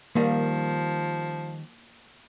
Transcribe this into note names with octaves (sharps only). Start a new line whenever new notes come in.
D#3 F3 G3 A#3